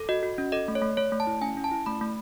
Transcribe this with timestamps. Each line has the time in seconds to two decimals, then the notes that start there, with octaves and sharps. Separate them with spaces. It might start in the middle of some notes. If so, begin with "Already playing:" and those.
Already playing: A4
0.09 F#4 D#5
0.23 F#4
0.38 C#4
0.52 A4 D#5
0.68 A3
0.75 C#5
0.82 A3
0.97 A3 C#5
1.12 A3
1.20 A5
1.27 E4
1.42 C#4 G#5
1.57 C#4
1.64 A5
1.71 E4
1.86 A3 B5
2.01 A3